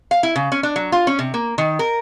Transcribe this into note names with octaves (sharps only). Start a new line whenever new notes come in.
F5
E4
C#3
C#4
D4
F#3
F4
C#4
C3
A#3
D#3
A#4